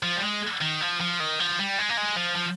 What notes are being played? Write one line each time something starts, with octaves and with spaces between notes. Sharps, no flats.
F3
G3
G#3
D#3
F3
F3
D#3
F3
G3
G#3
A#3
G#3
F3
F3